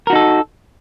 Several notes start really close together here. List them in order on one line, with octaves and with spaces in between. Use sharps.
A#4 F#4 D#4 A4